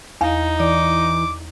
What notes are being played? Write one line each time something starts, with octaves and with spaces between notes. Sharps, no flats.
E2 D#4 F5
E3 D5 D6